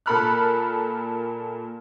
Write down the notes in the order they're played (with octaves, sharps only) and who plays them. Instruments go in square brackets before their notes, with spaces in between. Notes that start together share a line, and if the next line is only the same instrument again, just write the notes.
[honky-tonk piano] A#2 A4 A#4 B5 F6 F#6